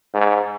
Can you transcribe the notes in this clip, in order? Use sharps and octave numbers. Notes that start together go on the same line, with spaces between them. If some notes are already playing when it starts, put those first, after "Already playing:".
G#2